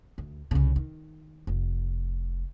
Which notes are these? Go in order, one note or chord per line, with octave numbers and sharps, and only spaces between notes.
D2
C2 C#3
D#3
F1